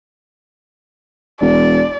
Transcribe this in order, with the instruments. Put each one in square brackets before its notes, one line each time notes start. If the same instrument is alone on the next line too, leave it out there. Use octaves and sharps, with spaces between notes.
[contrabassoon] E1 [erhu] D5